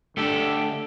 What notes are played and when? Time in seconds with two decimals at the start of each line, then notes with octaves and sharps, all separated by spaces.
0.17 D3 A3 G4 A4